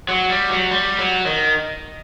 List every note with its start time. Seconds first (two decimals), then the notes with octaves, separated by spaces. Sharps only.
0.09 F#3
0.30 G3
0.50 F#3
0.71 G3
0.99 F#3
1.26 D#3